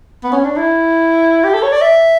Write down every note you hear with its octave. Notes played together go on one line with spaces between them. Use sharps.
B3
C#4
D4
E4
G4
A4
C#5
D5
E5